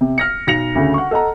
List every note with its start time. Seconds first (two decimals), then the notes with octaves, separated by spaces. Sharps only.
0.01 C3
0.18 F6 A#6 C#7
0.47 B1 A#6 C#7 F7
0.75 D2 C#3
0.94 F#5 C#6
1.11 A4 D#5 F#5 A#5